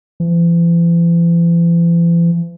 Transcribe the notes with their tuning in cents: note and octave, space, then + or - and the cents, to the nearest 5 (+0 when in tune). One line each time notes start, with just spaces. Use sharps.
E3 +45